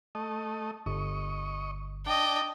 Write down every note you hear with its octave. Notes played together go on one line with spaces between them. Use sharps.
A3 D#5
G1 D#5 C#6
D4 D#5 G5 A5